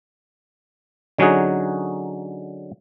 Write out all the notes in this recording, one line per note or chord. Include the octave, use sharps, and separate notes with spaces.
D3 F#3 C#4 D#4 F#4 G#4